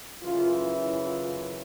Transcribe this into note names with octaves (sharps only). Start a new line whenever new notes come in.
F#2 C#3 E3 F4
E4
F4